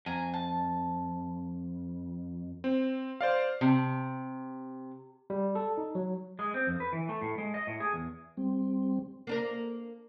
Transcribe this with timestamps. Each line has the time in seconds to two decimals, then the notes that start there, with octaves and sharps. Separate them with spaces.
0.06 F2 G#5 A#5
0.34 A5
2.64 C4
3.21 C5 D5 F5
3.61 C3
5.30 G3
5.55 A4
5.78 D#4
5.95 F#3
6.39 G#3
6.54 C4
6.67 F2
6.80 B4
6.93 E3
7.09 A3
7.21 A2
7.38 G#3
7.54 D#5
7.67 A2
7.80 G#4
7.93 E2
8.37 G3 C4
9.27 A#3 D4 A#4